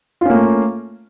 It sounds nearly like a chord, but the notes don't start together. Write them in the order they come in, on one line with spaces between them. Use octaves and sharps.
F4 C#4 A#3 A3